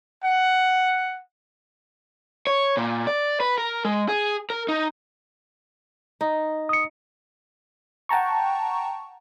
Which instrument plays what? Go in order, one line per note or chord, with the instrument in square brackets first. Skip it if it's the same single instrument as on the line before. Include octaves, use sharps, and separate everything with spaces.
[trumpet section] F#5
[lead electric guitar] C#5
A#2
D5
B4
A#4
G#3
G#4
A#4
D#4
[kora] D#4
[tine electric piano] D#6 C#7
[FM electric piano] F#5 G5 A5 A#5 C#6